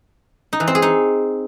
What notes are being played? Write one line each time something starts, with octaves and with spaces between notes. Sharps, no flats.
D#4
E3
C4
G#4
D#4